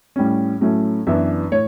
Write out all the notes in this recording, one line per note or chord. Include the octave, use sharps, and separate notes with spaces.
A2 G3 C#4
A2 F#3 A3 C#4
F#2 E3 B3 D4 E5
A2 C#5